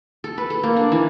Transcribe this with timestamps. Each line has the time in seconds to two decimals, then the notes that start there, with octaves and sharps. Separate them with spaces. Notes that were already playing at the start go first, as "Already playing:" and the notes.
0.24 A4
0.38 B4
0.50 A4
0.63 A#3
0.77 D4
0.92 E3